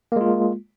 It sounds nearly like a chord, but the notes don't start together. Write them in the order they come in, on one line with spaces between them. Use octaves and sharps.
A#3 G#3 F4